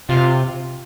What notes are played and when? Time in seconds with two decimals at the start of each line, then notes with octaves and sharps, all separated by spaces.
0.09 C3 F4